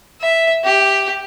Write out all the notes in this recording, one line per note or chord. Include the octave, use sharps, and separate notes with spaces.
E5
G4